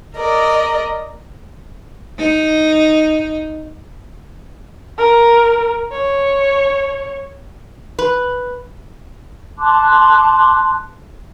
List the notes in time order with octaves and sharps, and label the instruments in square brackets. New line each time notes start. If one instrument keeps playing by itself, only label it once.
[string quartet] A#4 D5 D#5
[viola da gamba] D#4
[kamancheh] A#4
C#5
[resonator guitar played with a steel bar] B4
[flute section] A5 C6 D6 F#6